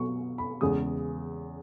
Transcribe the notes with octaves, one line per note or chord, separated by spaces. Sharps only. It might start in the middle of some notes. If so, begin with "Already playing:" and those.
Already playing: B2 F#3 B3 C#6
B5
E2 C#3 G#3 D#6